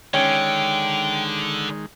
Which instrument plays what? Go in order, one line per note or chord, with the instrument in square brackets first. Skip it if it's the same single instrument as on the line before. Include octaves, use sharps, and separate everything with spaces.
[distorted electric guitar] D3 [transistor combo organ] D#3 G#3 [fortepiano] C#4 [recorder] G5